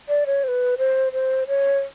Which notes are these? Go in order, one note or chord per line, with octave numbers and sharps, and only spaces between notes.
D5
C#5
C5
B4
C5
C5
C#5